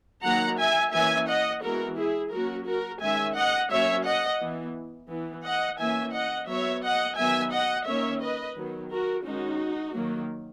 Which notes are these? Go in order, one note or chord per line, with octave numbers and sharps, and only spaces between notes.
D#3 F#3 A#3 F#5 A#5
E5 G#5
E3 A#3 C#4 E5 G#5
D#5 F#5
E3 G#3 B3 F#4 A#4
E4 G#4
F#3 A#3 C#4 F#4 A#4
F#4 A#4
D#3 G#3 C#4 E5 G#5
D#5 F#5
F#3 A#3 C#4 C#5 E5
D#5 F#5
E3 B3
E3 B3
D#5 F#5
E3 A#3 C#4 E5 G#5
D#5 F#5
F#3 B3 C#5 E5
D#5 F#5
D#3 F#3 B3 E5 G#5
D#5 F#5
D#3 A#3 C#4 C#5 E5
B4 D#5
D#3 F#3 B3
F#4 A#4
D#3 G#3 C#4 D#4 F#4
D#3 F#3 A#3